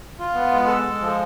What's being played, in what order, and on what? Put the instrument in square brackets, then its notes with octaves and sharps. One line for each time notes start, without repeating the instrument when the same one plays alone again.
[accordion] F4
B3
G#3
A4
G#3
F3